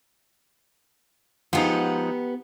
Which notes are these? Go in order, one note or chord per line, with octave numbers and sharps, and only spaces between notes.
F3 G#3 B3 D#4 G4 F#5